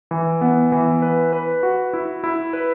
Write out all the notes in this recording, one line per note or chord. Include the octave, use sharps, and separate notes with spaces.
E3
B3
E3
B4
B4
F#4
E4
E4
B4